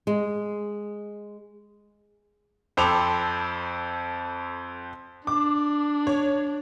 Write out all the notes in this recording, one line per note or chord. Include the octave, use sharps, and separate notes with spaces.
G#3
F2 C4 A4 B5 D6 F7
D4 D6
C#5